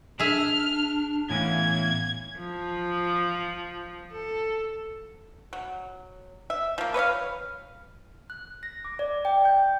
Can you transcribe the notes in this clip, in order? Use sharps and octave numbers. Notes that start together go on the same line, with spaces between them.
D4 G#4 E5 F6
A2 E3 B3 C#4 F5 G#6
F3
A4
F#3
E5
F3 A#3
B4 C#5 D#5 F5
F#6
A#6
D6
D5
G5
G6